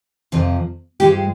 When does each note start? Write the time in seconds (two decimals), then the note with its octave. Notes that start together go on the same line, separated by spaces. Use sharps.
0.32 F2 C3 F3
1.00 G2 F3 G#3 G4